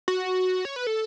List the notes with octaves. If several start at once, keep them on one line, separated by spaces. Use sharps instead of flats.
F#4
C#5
B4
A4